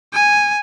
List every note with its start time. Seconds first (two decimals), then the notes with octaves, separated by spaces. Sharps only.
0.13 G#5